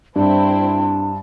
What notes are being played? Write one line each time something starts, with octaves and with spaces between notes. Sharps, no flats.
G2 C4 D4 E4 A5